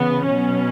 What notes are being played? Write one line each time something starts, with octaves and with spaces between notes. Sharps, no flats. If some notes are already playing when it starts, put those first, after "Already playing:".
Already playing: C#3 E3 B3
B2 F#3 C#4